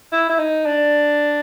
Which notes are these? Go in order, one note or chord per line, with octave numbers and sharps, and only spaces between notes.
E4
E4
D#4
D4